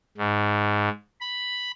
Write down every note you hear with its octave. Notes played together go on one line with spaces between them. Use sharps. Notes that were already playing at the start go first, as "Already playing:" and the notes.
G#2
B5